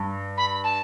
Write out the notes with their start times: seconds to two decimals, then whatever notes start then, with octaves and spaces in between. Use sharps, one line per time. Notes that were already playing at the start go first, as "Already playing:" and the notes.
Already playing: G2
0.38 B5
0.64 A5